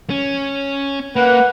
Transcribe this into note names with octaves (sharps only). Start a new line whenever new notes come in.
C#4
A#3 B4 F#5